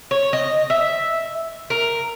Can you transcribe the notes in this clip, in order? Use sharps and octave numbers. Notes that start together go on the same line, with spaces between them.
C#5
D#5
E5
A#4